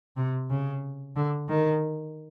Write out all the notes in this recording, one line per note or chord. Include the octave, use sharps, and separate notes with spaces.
C3
C#3
D3
D#3